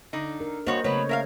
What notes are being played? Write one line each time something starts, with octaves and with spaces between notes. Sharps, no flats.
D3 D#4
A#4
G2 A#3 F#4 C5 C#5 D#5
C#3 F#3 A3 B3 B4 C#5
A#4 E5 F5